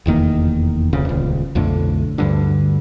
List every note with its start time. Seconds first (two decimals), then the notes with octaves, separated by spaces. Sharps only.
0.06 F1 E2 D#3 A#3
0.93 F1 D2 C#3
1.05 D#1 C#2
1.55 B1 F2 A2 D3
2.18 D2 G2 D3